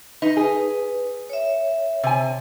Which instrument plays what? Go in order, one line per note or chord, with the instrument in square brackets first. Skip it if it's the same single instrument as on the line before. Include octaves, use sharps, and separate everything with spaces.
[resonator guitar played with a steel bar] D#4 [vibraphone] B4
[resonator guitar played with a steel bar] G#4
[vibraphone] C#5 E5
[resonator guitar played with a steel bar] C3 G#5